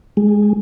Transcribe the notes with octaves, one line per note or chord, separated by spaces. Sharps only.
G#3